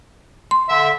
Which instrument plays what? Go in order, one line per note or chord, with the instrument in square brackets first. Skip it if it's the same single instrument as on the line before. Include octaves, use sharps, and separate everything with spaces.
[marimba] C6
[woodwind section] D3 E5